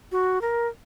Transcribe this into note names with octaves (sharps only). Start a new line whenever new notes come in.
F#4
A#4